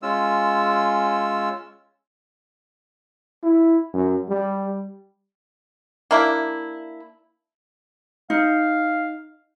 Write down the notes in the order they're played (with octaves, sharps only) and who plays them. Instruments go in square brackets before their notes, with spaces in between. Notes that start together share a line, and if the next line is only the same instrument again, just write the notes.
[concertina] G#3 C#4 F4 E6
[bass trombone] E4
F#2
G3
[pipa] A#3 D4 E4
[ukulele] D#4 [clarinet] F5